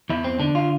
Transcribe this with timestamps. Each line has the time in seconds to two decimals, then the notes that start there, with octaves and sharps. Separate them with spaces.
0.10 E2 E4
0.24 C4
0.39 D3 D4
0.55 F4